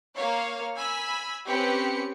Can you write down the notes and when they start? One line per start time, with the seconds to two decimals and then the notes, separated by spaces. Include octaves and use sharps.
0.16 A#3 C#5 F5
0.77 G#5 B5 E6
1.47 C4 C#4 G4 B4 C#7